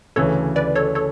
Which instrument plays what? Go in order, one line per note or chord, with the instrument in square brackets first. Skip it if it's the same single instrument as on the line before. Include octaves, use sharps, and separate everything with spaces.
[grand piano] D2 C#3 E3 [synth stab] A4 C#5
[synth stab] B4 D5
A4 C#5
A4 C#5